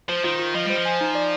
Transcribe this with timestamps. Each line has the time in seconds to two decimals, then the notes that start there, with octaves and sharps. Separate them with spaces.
0.08 F3 C5
0.24 D#3 F4
0.39 F4
0.54 F3 D#5
0.65 G3 C5
0.76 F3
0.85 G#5
1.01 D#4
1.15 D5